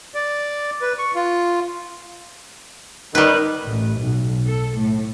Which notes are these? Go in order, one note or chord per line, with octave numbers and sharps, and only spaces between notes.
D5
B4
C#6
F4
D#3 G3 B4
A1
B1
A4
A2